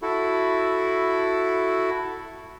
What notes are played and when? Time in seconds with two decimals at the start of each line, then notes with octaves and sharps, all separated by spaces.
0.02 E4 F#4 A4